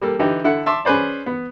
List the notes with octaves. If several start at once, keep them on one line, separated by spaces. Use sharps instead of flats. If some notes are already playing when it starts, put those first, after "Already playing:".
G3 A#3 A4
D3 E3 D#4 G4
D3 E4 A4 F#5
E5 A5 C6 D6
C#4 G#4 B4 C5 D5
B3